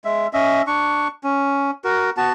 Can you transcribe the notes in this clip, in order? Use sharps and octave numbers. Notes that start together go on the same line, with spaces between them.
G#3 E5
C#4 D#5 E5
D4 C#6
C#4
F#4 A#4
B3 F#4 A5